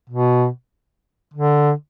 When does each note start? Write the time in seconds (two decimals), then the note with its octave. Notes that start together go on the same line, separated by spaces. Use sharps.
0.09 B2
1.34 D3